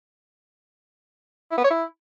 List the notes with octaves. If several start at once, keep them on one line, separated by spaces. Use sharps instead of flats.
E4
B3
C#5
E4